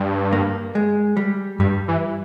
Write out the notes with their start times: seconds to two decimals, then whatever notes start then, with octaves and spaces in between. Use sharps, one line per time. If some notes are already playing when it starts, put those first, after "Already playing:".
Already playing: G2
0.33 A#3
0.75 G#3
1.17 G3
1.59 G2 G3
1.88 E3